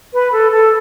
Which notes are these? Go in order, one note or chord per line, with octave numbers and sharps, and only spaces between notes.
B4
A4
A4